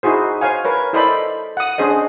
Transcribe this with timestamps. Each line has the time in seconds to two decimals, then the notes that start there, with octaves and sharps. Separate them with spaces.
0.03 D#4 E4 F#4 G#4 C5
0.41 C5 C#5 F5 G#5
0.65 A#4 B4 C#5
0.93 E4 A4 C5 D5 D#5 B5
1.57 F#5 D#6
1.78 C#4 D4 G#4 C5 D#5